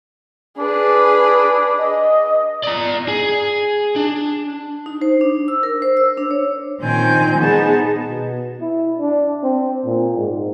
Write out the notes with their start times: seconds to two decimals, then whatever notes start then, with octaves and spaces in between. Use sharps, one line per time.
0.58 D4 G#4 B4
1.78 D#5
2.63 D5 A#5
3.08 G#4
3.96 D4
4.86 D#4
5.02 C5
5.21 D4
5.48 E6
5.63 A#4
5.82 C5
5.97 E6
6.17 D4
6.31 C#5
6.81 A#2 D#3 C4 C5 G#5 G6
7.39 B3 D#4 G#4 A5
8.07 B2
8.61 E4
8.99 D4
9.43 C4
9.85 A#2
10.17 G#2